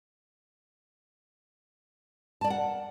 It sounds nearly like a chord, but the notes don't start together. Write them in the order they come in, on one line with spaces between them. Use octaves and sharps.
A5 D5 A#4 F#5